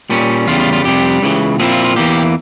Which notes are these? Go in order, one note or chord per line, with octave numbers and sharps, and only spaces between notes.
A#2 G3 C#4
E2 C#3 G3 F4
F4
F4
F2 C3 G3 G4
C#2 C#3 E3
A#2 F3 C4 E4 G#4
F4
F4
E2 E3 A#3 G4